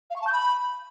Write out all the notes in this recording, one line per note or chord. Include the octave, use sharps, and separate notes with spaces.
F5
C#6
A5
G6
B5